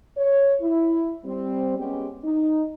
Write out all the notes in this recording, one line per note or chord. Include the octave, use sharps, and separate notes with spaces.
C#5
E4
G3 C4
G#3 B3 C#4 G4
D#4